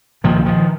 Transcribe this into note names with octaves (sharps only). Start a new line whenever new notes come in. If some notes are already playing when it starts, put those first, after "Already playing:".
C2 A#2 D#3 F3
D#3 F3